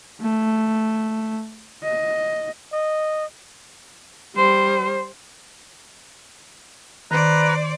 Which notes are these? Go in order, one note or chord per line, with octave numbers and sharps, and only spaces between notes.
A3
D#5
D#5
G3 C5
D#3 B4 C5 D5 A#5